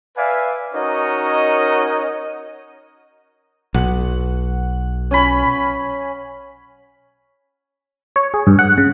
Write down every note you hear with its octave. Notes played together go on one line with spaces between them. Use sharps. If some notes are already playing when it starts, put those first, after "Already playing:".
B4 D5 E5 F5 G#5
C#4 D#4 F#4 A#4 C#5 D#5
B1 F#5
C#4 G#5 B5
C#5
G#4
G2
F#5
C#3